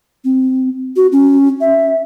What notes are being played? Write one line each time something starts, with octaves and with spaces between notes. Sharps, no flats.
C4
F#4
C#4
E5